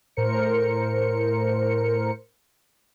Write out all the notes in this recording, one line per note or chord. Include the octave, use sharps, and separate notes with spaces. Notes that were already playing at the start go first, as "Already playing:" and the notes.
A2 A#4 C5 C#7